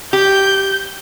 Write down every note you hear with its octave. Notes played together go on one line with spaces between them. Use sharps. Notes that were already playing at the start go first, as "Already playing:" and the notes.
G4 G6